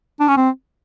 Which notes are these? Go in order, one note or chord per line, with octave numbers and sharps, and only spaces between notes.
D4
C#4
C4